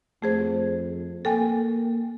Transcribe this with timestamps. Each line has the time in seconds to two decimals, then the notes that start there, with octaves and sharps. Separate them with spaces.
0.22 F2 A3 G#4 C5
1.25 A#3 A4 G5 G#5